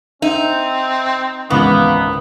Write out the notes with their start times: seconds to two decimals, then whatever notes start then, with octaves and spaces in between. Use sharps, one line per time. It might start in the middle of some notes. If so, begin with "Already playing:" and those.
0.22 C4 D#4 E5
1.50 G#1 C#2 E3 A#3 B3 C#6